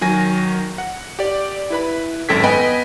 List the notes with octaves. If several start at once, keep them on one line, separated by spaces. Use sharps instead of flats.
D#3 F#3 G#5 A#6
F#5
G4 D5
E4 B4 B5
G#1 F#2 A4 G5 G#6 B6
B3 B4 D#5 G5 G#5 B5